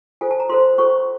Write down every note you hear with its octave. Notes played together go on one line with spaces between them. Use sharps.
F4 A4 C5 G#5
A5
A#5
F4 A4 C5 C6
C#4 F4 A4 C5 C#6